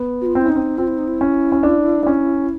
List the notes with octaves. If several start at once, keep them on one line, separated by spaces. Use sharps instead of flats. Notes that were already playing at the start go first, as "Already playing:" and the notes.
Already playing: B3
F#4
F4
C4
E4
C#4 D#4
C4
C4 F4
E4
D#4
E4
C#4
C#4
D4
D4
C#4